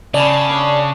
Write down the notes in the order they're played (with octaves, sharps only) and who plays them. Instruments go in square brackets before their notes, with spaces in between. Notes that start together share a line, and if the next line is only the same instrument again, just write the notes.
[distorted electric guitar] C#3 [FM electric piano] D5 [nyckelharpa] G#5 B5 [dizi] A5
[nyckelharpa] C#4 D4